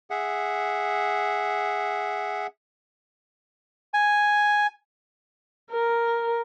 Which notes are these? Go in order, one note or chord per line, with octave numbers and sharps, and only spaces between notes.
G#4 E5 F#5
G#5
A#4